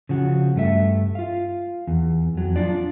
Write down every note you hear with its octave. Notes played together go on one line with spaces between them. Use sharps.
C#3 F3 F#4
G2 A3 E5
F4 F5
E2
F2 F#3
D4 F4 D5